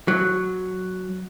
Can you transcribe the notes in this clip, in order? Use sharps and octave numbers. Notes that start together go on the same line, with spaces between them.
F#3